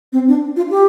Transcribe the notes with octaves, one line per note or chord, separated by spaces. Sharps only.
C4
D4
F4
G4